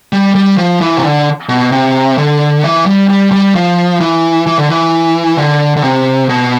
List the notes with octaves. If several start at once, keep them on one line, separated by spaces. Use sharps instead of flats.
G3
G3
F3
E3
C3
D3
B2
C3
D3
E3
G3
G3
G3
F3
E3
E3
D3
E3
D3
D3
C3
B2